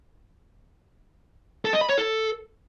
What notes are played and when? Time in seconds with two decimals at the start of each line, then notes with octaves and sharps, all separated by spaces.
1.65 A4
1.73 D#5
1.81 B5
1.89 C#5
1.97 A4